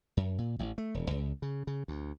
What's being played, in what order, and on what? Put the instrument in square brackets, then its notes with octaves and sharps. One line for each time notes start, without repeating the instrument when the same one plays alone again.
[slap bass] F#2
A#2
A1
A3
E1
C#2
C#3
C#3
D2